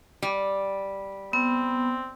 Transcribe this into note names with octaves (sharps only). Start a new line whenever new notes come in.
G3
B3 C4